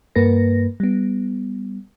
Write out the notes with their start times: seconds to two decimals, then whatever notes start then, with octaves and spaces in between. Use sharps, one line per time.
0.15 G2 A#3 A#4 B4 A#6
0.80 G3 B3